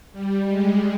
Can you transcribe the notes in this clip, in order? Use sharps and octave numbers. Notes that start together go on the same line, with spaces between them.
G3
G#3